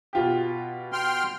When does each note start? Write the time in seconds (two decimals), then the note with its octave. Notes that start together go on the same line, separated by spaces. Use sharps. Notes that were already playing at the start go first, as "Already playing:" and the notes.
0.13 B2 F4 G4
0.93 G5 C6 F6